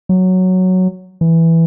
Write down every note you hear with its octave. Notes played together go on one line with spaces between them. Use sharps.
F#3
E3